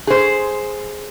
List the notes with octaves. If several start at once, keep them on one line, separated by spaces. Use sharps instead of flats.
G#4 C5